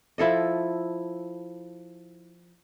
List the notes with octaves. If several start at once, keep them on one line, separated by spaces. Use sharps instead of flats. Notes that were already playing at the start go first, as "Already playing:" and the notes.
F3 E4 A4 D#5